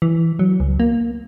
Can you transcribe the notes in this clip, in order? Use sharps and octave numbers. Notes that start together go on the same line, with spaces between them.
E3
F#3
C#2
A#3